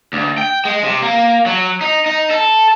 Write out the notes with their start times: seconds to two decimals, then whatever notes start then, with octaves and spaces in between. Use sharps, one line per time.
0.13 D2
0.38 G5
0.65 G#3
0.84 C3
1.02 A#3
1.46 F#3
1.81 D#4
2.06 D#4
2.31 A4